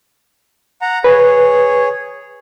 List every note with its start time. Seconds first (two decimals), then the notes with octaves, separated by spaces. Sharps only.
0.82 F#5 A#5
1.04 G#4 B4 C#5